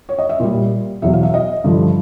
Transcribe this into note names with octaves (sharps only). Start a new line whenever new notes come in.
C#5
D#5
E5
A#2 G3
E2 B2 F#3 E5
F5
E5
D#5
G2 D3 F3